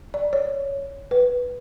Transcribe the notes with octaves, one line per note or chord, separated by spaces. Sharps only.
D5
C#5
B4